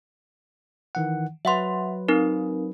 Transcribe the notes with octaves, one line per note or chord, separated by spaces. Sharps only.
D#3 E3 F#5
F#3 B4 E5 F#5 C6
C4 D#4 A#4